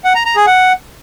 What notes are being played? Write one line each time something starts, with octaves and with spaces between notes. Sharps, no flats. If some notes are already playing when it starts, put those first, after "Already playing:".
F#5
A#5
A#5
G#4
F#5